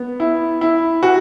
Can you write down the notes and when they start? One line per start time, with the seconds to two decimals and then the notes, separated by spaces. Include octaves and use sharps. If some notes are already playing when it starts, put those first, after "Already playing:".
Already playing: B3
0.20 E4
0.61 E4
1.03 F#4